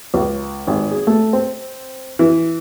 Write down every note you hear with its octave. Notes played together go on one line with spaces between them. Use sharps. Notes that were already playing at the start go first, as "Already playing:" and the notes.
C#2
G#1
G#4
A3
C4
E3